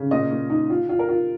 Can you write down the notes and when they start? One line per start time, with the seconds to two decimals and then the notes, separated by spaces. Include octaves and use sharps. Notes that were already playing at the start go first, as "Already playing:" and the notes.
Already playing: C#3
0.11 A#2 D#5
0.31 A#2
0.50 D#4
0.70 F4
0.89 F4
0.99 A#4
1.09 F4